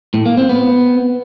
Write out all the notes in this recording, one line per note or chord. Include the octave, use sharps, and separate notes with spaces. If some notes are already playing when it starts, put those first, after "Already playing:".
A2
A#3
C4
B3